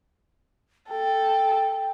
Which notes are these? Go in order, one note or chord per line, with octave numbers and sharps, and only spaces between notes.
A4 G5